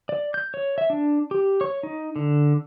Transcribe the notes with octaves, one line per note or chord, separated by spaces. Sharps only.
D5
G6
C#5
E5
D4
G4
C#5
D#4
D3